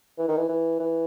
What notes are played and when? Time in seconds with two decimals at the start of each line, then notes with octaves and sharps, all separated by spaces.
0.18 E3
0.28 D#3
0.37 E3
0.49 E3
0.80 E3